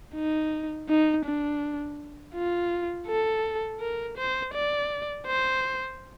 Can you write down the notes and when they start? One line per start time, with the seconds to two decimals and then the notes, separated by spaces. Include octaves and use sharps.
0.15 D#4
0.89 D#4
1.25 D4
2.34 F4
3.08 A4
3.80 A#4
4.17 C5
4.54 D5
5.27 C5